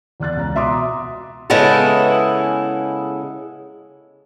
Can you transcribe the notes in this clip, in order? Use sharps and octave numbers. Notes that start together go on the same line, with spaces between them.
E2 D5 F#6 A6
C#2 A#5
B2 E5 A#5 C6 D6 D#6
C#3 G#3 B3 E4 A4